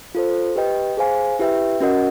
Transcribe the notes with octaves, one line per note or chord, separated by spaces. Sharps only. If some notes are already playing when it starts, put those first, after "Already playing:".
F4 A4 C5
G4 B4 D#5 G5
G#4 C5 F5 G#5
E4 G4 B4 E5 G5
C#4 F#4 A#4 D#5 F#5